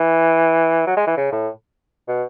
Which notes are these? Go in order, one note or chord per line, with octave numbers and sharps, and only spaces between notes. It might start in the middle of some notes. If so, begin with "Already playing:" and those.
Already playing: E3
F#3
G#3
E3
C#3
A2
B2